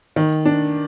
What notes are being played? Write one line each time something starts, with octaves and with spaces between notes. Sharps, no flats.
D#3
D4